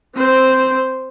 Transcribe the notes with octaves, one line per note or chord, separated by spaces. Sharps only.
C4 C5